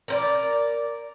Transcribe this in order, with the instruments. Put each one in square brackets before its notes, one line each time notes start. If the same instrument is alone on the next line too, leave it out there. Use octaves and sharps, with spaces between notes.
[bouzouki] A#4 C5 D5